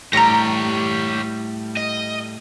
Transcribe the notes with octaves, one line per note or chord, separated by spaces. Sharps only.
A2 G3 G4 C#5 A#5 A#6
D#5